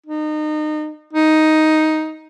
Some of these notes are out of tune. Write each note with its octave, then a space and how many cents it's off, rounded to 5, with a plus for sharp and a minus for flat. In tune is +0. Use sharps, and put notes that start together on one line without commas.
D#4 -30
D#4 +5